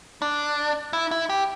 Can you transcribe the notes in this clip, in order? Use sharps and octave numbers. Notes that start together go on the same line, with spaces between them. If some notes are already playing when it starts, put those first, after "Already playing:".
D4
E4
E4
G4